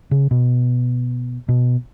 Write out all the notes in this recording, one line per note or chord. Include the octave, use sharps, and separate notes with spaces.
C#3
B2
B2